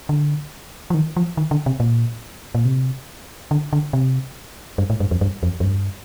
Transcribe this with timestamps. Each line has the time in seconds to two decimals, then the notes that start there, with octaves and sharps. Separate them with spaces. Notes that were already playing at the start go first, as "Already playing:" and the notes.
0.09 D3
0.90 F3
0.94 D#3
1.16 F3
1.37 D#3
1.51 D3
1.66 C3
1.80 A#2
2.55 A#2
2.65 C3
3.51 D3
3.73 D3
3.93 C3
4.78 G2
4.90 A2
5.00 G2
5.11 F2
5.21 G2
5.43 F2
5.60 F2
5.64 G2